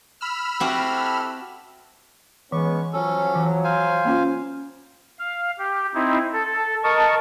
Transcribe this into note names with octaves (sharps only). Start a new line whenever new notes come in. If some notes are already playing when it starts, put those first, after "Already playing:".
B5 E6 F6
C4 E4 F#4 G4 A4
E3 G#3 B3 C#4 C#6
F3 F#3 C#4 A4
E3
C5 F5 G#5
A#3 C#4 F4
F5
G4
C4 D#4 E4
A4
A#4 D#5 A5 C#6